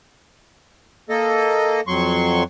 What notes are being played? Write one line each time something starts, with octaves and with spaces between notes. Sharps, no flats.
A#3 A4 D#5
F2 F#3 C6 C#6